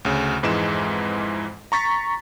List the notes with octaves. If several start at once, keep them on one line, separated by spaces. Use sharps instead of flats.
D2 C#3
F2 G#2 E3 G#3 E7
A#5 C#6 A6 B6